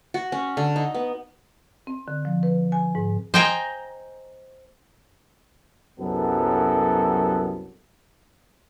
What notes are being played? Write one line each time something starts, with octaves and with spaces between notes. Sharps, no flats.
F#4
C#4
D3
D#4
B3
C4
D3
F3
B4
G#5
G#2
C5 D#5 G5 G#5 A#5
C2 F#2 F#3 B3 A4